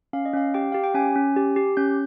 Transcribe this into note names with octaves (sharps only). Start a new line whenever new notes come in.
C#4 F5
D#5
C#4 F5
G4 G5
G4 F5
G5
C#4 G#5
C#4
G4
G4
C#4 G6